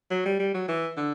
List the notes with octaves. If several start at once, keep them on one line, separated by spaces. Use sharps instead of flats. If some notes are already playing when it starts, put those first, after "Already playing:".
F#3
G3
G3
F#3
E3
D3